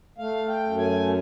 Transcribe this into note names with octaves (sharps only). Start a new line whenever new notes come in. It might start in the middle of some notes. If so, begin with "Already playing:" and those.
A3 F5
G5
F#2
G#5